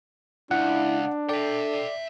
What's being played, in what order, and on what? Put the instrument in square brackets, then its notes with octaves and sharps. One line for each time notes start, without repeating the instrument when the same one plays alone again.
[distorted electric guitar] C#2 [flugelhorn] D4 [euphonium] E4 [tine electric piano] F#5
[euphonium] A4 [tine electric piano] D5 [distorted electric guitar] E5 G5